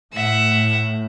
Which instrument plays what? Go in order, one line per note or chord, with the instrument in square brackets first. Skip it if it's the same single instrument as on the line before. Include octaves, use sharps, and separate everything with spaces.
[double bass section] A2 [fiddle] E5 F#5